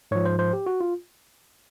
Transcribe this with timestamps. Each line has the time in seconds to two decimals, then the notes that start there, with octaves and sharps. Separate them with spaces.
0.11 G#2 F3 C#5
0.26 C5
0.39 C5
0.53 G4
0.66 F#4
0.81 F4